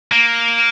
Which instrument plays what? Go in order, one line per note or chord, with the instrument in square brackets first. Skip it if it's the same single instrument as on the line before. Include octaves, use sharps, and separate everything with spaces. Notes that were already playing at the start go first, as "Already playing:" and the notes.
[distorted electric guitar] A#3